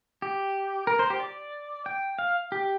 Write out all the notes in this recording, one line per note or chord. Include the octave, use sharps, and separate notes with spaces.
G4
A#4
C5
G4
D5
G5
F5
G4